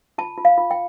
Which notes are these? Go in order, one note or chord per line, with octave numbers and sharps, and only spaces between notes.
F4 A5
F4
F5
F4
G5